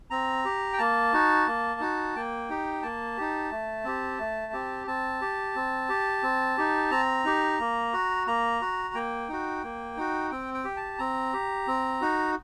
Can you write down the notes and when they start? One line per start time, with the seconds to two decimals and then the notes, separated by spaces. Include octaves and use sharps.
0.10 C4 A#5
0.45 G4
0.73 G5
0.78 A#3 A5
1.13 D#4 F#4
1.47 A#3
1.80 D#4 F#4
2.16 A#3 G5
2.50 D#4 G4
2.82 A#3 A5
3.17 D#4 G4
3.51 A3
3.84 C4 G4
4.20 A3
4.53 C4 G4
4.87 C4 A5
5.21 G4
5.55 C4
5.89 G4
6.23 C4
6.58 D#4 G4
6.91 C4 A#5
7.25 D#4 G4
7.60 A#3
7.93 F#4
8.27 A#3 A#5
8.61 F#4
8.95 A#3 G5
9.29 D#4 F#4
9.64 A#3
9.97 D#4 F#4
10.31 C4 G5
10.54 G5
10.65 G4
10.77 A5
10.99 C4 A#5
11.33 G4
11.67 C4
12.01 D#4 F#4